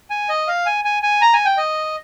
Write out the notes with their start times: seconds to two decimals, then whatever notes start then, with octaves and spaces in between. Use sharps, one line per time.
0.10 G#5
0.29 D#5
0.48 F5
0.66 G#5
0.84 G#5
1.03 G#5
1.21 A#5
1.33 G#5
1.45 G5
1.57 D#5